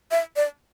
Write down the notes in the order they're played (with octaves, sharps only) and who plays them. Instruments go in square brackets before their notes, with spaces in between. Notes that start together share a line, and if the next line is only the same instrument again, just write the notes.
[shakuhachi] E5
D5